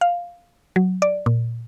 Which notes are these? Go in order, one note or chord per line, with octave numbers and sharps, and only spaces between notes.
F5
F#3
D5
A#2